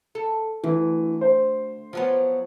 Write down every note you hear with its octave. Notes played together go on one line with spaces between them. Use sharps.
A4
D2 E3
C5
F3 F#3 B3